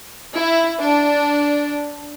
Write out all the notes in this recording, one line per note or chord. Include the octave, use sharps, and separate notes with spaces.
E4
D4